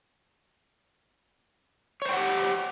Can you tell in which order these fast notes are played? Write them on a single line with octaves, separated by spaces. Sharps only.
C#5 C5 G5 F#5 G4